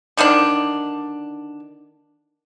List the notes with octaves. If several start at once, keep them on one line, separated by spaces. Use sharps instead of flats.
D3 D#3 A#3 D4